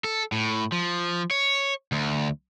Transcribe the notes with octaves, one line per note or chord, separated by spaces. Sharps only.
A4
A2
F3
C#5
D2